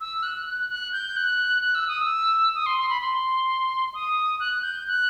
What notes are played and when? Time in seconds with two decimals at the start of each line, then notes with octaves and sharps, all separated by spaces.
0.01 E6
0.23 F#6
0.47 F#6
0.70 F#6
0.93 G6
1.16 F#6
1.62 F#6
1.75 E6
1.88 D#6
2.01 E6
2.55 D#6
2.66 C6
2.78 C6
2.90 B5
3.01 C6
3.94 D#6
4.40 F#6
4.63 G6
4.88 F#6